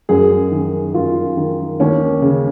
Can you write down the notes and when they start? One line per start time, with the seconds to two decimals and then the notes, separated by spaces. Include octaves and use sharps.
0.09 F#2 G#4
0.52 D#3
0.94 F#2 F4
1.37 D#3
1.80 D#2 C#4
2.22 C#3